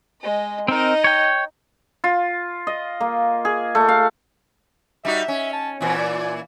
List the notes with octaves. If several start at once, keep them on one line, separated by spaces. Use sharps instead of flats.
G#3 D#5
C4 D#4 A#4 D#5
C#5 G5
F4
D#5
A#3
G#4
A3
F5
G3 D#4 F#4 E5
C#4
A5
A#2 E3 C4
D5